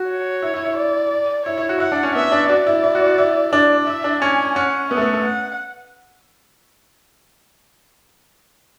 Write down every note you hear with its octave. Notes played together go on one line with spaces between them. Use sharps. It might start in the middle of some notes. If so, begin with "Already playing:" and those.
Already playing: F#4
C#5
E4
E4
E4
D5
E4 C#5
E4
F#4
E4 F#5
D4
C#4
B3 E5
D4
F#4 D5
E4
E4
F#4
F#4
E4
D4 D5
E4 E5
D4
C#4 G#5
C#4 F#5
B3 E5
A3
B3
A3
F#5